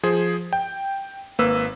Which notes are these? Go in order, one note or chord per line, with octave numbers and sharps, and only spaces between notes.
F3 G#4 C5
G5
G#1 A#3 B4 E6